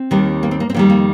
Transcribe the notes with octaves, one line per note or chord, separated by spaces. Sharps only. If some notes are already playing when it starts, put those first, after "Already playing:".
Already playing: C4
D#2 D#3 G3
A#3
C4
A#3
C4
F2 D#3 G3 A#3
A#3